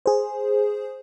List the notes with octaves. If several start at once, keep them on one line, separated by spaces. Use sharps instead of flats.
G#4 C5